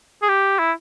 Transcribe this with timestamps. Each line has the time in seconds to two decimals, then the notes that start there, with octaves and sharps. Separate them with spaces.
0.22 G#4
0.29 G4
0.59 E4